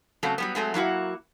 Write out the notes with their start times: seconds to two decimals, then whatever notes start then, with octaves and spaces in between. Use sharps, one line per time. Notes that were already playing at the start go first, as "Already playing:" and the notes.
0.23 C#3 F#3 A3 C4 A4
0.38 F#3 G3 B3
0.55 F#3 G#3 A3 C4
0.74 F#3 A#3 E4 F#4